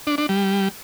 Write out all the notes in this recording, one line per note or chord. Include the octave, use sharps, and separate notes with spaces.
D4
D4
G3